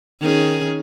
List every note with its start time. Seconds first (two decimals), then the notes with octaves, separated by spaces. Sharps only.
0.20 D#3 C#4 G#4